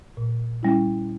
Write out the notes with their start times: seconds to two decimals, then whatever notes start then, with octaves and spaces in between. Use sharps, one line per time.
0.17 A#2
0.63 G3 C#4 E4